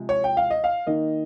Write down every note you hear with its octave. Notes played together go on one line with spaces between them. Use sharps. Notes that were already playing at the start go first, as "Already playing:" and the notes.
Already playing: C3 F3 G#3
C#5
G5
F5
D#5
F5
D#3 A#3 D#4 D#5